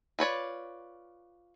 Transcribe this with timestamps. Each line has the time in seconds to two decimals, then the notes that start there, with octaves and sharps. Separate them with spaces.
0.19 F4 B4 C#5 D5